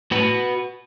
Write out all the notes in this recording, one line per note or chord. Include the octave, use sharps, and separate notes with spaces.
A2 F#4 B4